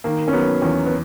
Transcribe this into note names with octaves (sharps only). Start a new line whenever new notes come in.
D#3 A#3
C#4
F#3 B3
E2 C#4
B3